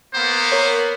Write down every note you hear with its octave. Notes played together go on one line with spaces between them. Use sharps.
A#3 B3 C5
A#4 C#5